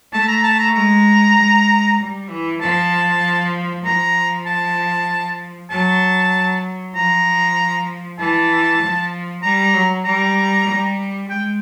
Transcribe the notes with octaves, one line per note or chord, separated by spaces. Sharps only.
A3 A5
A#5
A5
A#5
G#3 A#5
G#3
G3
E3
F3 A5
F3 A#5
A5
F#3 A5
F3 A#5
E3 A5
F3
G3 A#5
F#3
G3 A#5
G3
G#3 G5